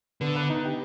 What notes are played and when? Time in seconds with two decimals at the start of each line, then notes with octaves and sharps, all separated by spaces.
0.21 D3 B3
0.36 B4
0.49 D#4
0.65 G4